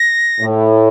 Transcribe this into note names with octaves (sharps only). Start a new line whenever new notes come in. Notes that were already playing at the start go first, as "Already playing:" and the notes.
Already playing: A#6
A2